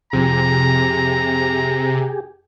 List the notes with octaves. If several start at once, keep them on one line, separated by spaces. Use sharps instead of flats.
F2 C3 G4 G#4 A#5